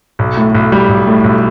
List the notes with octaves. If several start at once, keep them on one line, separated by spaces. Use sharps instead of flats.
B1
A2
B1
G3
B1
A2
B1